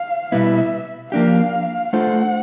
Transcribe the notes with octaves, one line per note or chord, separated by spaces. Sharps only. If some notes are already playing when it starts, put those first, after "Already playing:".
Already playing: F5
B2 G3 B3 E4 E5
F3 A#3 D4 G4 F5
A3 D4 F4 A4 C5 F#5